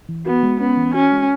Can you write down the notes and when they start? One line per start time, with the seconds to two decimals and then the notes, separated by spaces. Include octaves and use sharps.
0.09 E3
0.26 B3 F#4
0.43 G#3
0.60 B3 C#4
0.77 E3
0.94 C#4 F#4
1.12 G#3